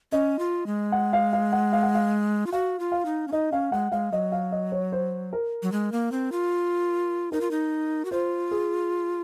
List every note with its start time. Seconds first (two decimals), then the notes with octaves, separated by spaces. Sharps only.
0.12 C#4 D#5
0.39 F4
0.66 G#3
0.92 F#5
1.13 F5
1.33 F5
1.53 F#5
1.73 F5
1.83 F#5
1.95 F5
2.46 F4
2.52 F#4 F5
2.80 F4
2.92 F5
3.05 D#4
3.28 C#4
3.32 D#4 D#5
3.52 C#4 F5
3.72 G#3 F#5
3.92 G#3 F5
4.12 F#3 D#5
4.32 F5
4.52 D#5
4.72 C#5
4.92 C5
5.33 A#4
5.63 F#3
5.72 G#3
5.92 A#3
6.12 C4
6.32 F4
7.32 D#4 A#4
7.41 F4
7.51 D#4
8.05 F#4
8.11 F4 C5
8.51 G#4